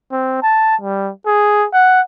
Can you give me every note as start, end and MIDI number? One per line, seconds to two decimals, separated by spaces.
0.11 0.40 60
0.42 0.76 81
0.81 1.11 55
1.26 1.67 68
1.73 2.01 78